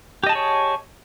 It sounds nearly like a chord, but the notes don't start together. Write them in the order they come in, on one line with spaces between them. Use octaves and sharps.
G4 D#5 A5 G#4 C#5